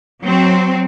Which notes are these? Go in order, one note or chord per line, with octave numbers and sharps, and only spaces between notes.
F#3 C4